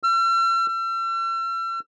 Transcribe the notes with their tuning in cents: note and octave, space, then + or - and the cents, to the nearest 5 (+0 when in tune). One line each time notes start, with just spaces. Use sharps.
E6 +45
E6 +40